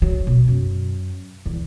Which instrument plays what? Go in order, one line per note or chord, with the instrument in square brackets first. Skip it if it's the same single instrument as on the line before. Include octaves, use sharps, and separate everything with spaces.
[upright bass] F#3
B2
F#2
E2